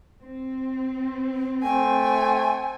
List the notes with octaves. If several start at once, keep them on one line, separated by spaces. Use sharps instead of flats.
C4
A3 C5 G5 G#5